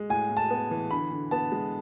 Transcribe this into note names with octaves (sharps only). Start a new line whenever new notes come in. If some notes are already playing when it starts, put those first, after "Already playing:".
Already playing: G#3
A2 G#5
A2
A5
B3
E3
D3 B5
D3
B3 A5
G#3